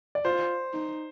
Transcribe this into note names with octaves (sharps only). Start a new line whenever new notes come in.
D5
F4 C5
D#4